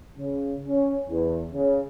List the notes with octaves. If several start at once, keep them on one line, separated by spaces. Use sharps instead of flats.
C#3
C#4
E2
C#3